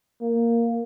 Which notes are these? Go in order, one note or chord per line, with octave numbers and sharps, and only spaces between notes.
A#3